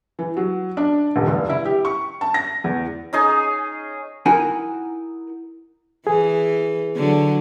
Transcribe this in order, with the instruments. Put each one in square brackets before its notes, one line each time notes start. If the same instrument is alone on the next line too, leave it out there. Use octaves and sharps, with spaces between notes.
[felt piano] E3
F#3
D4
D#1
F1
E4
G4
C#6
A5
A#6
E2
[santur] C#4 D#4 G#4
[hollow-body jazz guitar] D#4 E4 F#4 A#4 G5 G#5
[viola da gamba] E3 [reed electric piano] G#4
[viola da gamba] D3 F#3